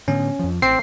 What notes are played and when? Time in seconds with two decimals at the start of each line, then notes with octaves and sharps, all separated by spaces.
0.08 A2 D3 B3 C#4
0.39 F2 F3
0.62 A1 C4 C7